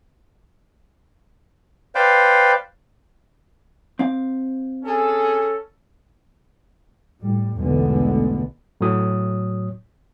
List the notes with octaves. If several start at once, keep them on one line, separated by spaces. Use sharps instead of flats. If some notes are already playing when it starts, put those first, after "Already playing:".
B4 C5 D5 F5 G5
C4 F5
C#4 G#4 A4
A2 G3
B1 E2 D3 G#3 A3 B3
A2 F#3 C#5 D#6